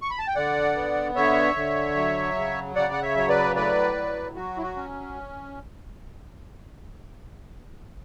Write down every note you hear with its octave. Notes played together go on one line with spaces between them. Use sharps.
C#6
B5
A5
G5
D3 D5 F#5
B3
D3 C#5 E5
D3
F#3
C#3
C#3 D5 F#5
F#5
C#5 E5
F#3 C#5
B4 D5
A2 B4 D5
F#3
F#3 F#4
E4
F#4
C#4